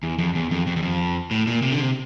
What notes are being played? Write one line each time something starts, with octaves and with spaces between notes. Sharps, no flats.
E2
F2
E2
F2
F2
E2
F2
A2
A#2
C3
D3
C3